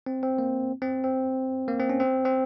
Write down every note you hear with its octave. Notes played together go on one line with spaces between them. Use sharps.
C4
C4
A#3
C4
C4
A#3
C4
C#4
C4
C4